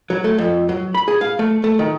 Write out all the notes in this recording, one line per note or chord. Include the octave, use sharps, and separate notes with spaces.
F#3
A3
F2
F#3
B5
G#4
F5
A3
A3
D#3